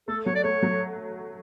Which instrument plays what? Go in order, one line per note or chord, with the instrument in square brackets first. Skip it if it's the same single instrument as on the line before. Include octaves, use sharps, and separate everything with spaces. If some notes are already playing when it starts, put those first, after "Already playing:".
[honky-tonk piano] A3 [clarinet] A4
[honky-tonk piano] F#3 [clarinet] C#5
[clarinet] D5
[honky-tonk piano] A3 [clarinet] C#5
[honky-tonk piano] F#3